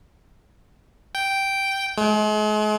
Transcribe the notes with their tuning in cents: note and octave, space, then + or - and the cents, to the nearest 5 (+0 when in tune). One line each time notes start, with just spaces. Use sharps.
G5 -5
G#3 +40